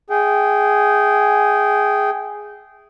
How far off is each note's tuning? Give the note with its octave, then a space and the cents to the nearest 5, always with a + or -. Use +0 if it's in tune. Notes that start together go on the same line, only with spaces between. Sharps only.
G#4 +0 E5 +0 G5 -20